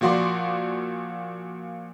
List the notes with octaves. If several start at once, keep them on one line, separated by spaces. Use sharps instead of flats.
A#2 F3 F#4 D5 C6 D6